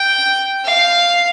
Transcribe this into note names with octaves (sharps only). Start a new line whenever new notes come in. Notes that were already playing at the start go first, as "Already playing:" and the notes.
Already playing: G5
F5